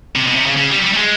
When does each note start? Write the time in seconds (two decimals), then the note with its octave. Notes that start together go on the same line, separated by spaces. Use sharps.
0.16 C3
0.27 B2
0.36 C3
0.46 C#3
0.57 C#3
0.71 G3
0.79 F#3
0.84 G3
0.93 A3
0.97 G#3